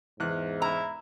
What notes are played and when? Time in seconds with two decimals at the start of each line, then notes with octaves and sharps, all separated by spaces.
0.20 E2 G#2 F#6
0.62 E4 A#5